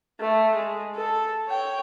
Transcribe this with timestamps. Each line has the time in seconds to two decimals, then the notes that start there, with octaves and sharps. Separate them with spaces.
0.20 A3
0.55 G#3
0.96 A4
1.49 C#5 G5